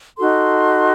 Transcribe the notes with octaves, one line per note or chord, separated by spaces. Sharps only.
D#4 F#4 A4 C6